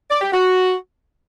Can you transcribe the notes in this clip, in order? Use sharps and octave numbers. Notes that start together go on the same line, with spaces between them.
D5
G4
F#4